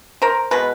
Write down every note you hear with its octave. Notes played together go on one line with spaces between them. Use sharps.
A#4 C5
B2 G#3 B3 B4